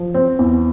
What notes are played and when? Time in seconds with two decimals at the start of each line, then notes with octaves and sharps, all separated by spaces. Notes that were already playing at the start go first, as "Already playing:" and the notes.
Already playing: F3
0.14 C4
0.39 E2